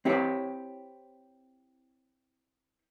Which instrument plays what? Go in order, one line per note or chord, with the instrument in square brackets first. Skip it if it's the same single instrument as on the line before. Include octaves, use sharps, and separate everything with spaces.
[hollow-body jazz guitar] C4 E4 G4 C#5